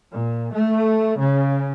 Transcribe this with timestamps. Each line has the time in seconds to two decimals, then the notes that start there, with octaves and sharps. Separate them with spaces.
0.12 A#2
0.53 A3
1.18 C#3